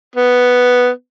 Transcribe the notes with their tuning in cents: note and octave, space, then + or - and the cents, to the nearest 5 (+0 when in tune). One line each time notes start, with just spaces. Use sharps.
B3 +0